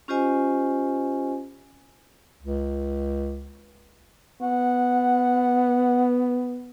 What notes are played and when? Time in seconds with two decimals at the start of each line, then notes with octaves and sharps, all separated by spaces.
0.08 C#4 F4 G4 C5 D#5 G#5
2.41 C#2
4.42 B3 F#5